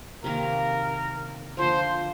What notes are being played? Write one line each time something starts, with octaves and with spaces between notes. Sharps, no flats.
C3 D#3 A#3 A#4
D3 F3 A#3 C5